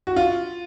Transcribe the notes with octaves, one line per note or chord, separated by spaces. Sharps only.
F#4
F4